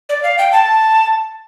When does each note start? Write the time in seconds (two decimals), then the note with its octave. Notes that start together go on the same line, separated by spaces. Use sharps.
0.09 D5
0.23 F5
0.38 G5
0.52 A5